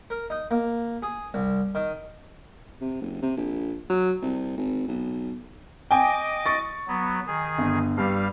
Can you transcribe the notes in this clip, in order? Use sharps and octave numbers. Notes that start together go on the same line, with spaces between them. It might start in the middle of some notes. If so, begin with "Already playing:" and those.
A#4
D#4
A#3
G#4
C2
D#3
C3
F#1
C3
A#1
F#3
C2
G#1
B1
D#5 G5 G#5 D6
C#6 A6
F#3 B3
D#3 G#4
G1
G2 G3 F5